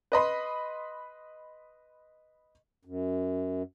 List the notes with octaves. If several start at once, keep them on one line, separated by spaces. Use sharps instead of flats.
B4 D#5 B5 C6
F#2